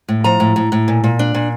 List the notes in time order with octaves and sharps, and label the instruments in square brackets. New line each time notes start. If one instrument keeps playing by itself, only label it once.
[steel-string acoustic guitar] A2
F3 A#5
A2
A2
A2
A#2
A#2
D4
A#2